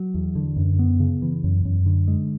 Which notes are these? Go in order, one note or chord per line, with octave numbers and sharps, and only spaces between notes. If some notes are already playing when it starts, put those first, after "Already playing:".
Already playing: F#3
E2
D3
F#2
B3
C#3
E3
F#2
F#2
D3
G#3